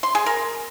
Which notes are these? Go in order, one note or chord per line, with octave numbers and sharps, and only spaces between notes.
C6
G#4
A#4